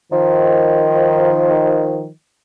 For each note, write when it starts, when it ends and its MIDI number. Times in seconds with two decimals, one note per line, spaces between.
0.12 2.09 51
0.12 2.09 53